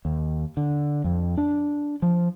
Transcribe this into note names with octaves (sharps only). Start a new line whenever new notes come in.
D#2
D3
F2
D4
F3